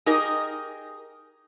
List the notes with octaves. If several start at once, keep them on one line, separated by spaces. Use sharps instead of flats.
D#4 G4 G#4 A#4 D#5